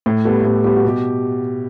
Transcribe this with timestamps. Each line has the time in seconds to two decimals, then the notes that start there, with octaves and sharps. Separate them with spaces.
0.06 A2
0.25 G3 B3 A4
0.45 A2 G4
0.64 G3 B3 G4
0.77 F#4
0.85 B2 G4